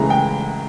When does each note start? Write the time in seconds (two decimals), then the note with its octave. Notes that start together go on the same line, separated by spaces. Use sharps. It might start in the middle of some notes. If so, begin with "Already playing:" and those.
Already playing: C#2 C#3 E3 A3 A#5
0.10 G5